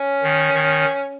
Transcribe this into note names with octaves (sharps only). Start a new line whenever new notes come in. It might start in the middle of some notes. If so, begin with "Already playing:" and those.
Already playing: C#4
D#3
D#3